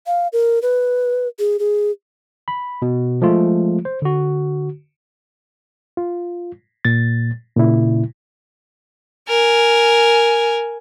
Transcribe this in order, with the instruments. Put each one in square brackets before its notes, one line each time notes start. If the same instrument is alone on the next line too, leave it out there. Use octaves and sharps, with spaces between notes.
[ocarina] F5
A#4
B4
G#4
G#4
[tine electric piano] B5
B2
F3 G#3 A3 F4
C5
D3 F#4
[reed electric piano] F4
A#2 A6
A#2 C#3 E4
[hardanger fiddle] A#4 G#5